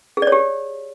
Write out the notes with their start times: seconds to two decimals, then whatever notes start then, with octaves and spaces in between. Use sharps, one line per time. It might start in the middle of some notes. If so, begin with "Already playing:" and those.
0.17 G#4
0.22 D5
0.27 C#5
0.32 G4